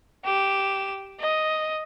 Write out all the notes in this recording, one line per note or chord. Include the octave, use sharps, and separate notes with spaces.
G4 E7
D#5